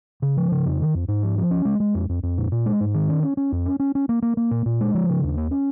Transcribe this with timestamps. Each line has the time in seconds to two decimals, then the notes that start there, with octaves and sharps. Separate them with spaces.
0.22 C#3
0.37 F3
0.52 C#3
0.66 F2
0.80 D#3
0.94 F2
1.08 G#2
1.23 F3
1.37 F3
1.51 C#4
1.65 G#3
1.80 G#3
1.95 F2
2.09 F2
2.23 F2
2.38 A#2
2.52 A#2
2.66 G#3
2.81 G#2
2.94 D#3
3.09 C#4
3.23 C#4
3.37 C#4
3.52 F2
3.66 C#4
3.80 C#4
3.95 C#4
4.09 A#3
4.22 A#3
4.37 A#3
4.51 A#2
4.66 A#2
4.81 G#3
4.94 F3
5.09 C#3
5.23 D#2
5.38 A#3
5.51 C#4